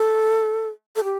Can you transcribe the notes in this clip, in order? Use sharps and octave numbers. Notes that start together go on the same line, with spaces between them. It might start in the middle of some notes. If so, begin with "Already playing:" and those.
Already playing: A4
A4
G4